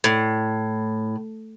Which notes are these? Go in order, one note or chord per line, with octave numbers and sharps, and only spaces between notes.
A2